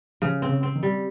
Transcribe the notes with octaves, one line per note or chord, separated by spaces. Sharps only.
C#3 F3
C4
C#3
C4
D#3
G3